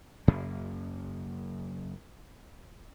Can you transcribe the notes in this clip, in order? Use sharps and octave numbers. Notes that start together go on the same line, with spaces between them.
F#1 F#2 C#3 A#3